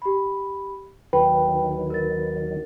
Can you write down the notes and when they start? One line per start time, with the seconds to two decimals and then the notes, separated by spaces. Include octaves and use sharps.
0.02 G4 B5
1.13 D#2 D#3 F#3 B4 G5
1.90 A#4 A6